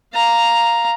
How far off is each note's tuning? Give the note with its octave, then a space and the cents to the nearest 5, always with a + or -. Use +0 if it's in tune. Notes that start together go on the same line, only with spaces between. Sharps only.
F5 +0 A#5 +0